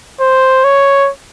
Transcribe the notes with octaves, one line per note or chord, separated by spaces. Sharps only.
C5
C#5